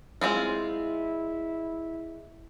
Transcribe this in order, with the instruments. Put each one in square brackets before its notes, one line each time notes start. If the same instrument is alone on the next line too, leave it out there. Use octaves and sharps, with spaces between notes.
[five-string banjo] G#3 C4 F4 [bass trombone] E4